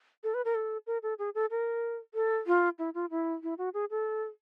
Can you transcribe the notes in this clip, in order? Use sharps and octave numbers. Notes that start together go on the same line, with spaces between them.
A4
B4
A#4
A4
A#4
A4
G#4
A4
A#4
A4
F4
E4
F4
E4
E4
F#4
G#4
A4